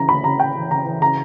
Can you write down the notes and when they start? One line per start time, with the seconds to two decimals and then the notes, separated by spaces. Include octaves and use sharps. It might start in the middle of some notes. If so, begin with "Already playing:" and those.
Already playing: C#3 E3 A#5
0.09 D2 B5
0.24 C#3 A#5
0.40 C#3 G5
0.56 E3
0.71 C#3 A#5
0.86 E3
1.02 C#3 A#5